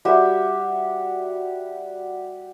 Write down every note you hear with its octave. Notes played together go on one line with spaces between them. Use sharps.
G3 F#4 G4 E5